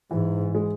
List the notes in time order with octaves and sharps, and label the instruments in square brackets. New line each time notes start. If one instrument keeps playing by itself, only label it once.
[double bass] G#2 [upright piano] E3
[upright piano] G#3